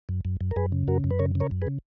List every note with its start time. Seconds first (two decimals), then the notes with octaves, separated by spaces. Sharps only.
0.09 F#2
0.25 F#2
0.41 F#2
0.51 A#4
0.56 F#2 G#4 B4
0.72 C#3
0.88 F#2 F#4 A#4
1.04 F#2
1.11 B4
1.19 C#3 A#4 C#5
1.35 C#3
1.40 A#4 C#5
1.51 F#2
1.62 G#4 B4
1.67 C#3